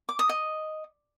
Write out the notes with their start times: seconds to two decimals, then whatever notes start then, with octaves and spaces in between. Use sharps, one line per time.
0.09 D6
0.19 D#6
0.29 D#5